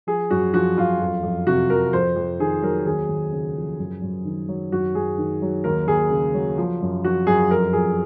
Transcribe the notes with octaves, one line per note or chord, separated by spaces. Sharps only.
F3 G#4
F#2 F#4
F3 F#4
F#2 F4
F2
F2
C3 F#4
F3 A#4
F2 C5
F2
D#3 G#4
F#3 A#4
D#2 G#4
D#2
C#3
F3
F#2
F#2
D#3
F#3
F#2 F#4
F#2 G#4
D#3
F#3
D#2 A#4
D#2 G#4
C#3
F#3
F3
F#2
F3 F#4
F#2 G#4
F2 A#4
F2 G#4